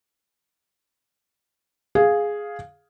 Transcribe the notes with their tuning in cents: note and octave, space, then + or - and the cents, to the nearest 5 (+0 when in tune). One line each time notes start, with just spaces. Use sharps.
G#4 +0 F5 +5